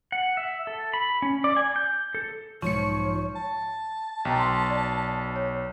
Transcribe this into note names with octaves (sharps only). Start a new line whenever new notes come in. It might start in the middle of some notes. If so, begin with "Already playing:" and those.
F#5
E5
A4
B5
C#4
D5
G#5
G6
A4
B1 G#2 F3 C#5 C#6 C#7
A5
B1 G5 A#5
C6
D5
C#5